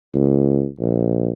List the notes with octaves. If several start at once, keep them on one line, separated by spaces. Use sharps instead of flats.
C#2
A#1